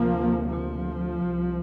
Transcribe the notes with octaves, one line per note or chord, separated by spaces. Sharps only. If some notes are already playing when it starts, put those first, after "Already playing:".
Already playing: D2 C3 F3 A#3
F3
C2 C3